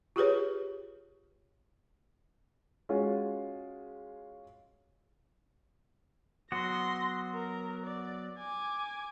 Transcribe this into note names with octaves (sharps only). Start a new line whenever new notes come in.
F4 G4 G#4 B4 C#5
G#3 C#4 F4 F#4
F#3 B3 F#4 C6 A#6
A#4
D5
G#5 D6